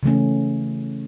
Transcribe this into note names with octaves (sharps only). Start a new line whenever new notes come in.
C#3 E3 A3 C#4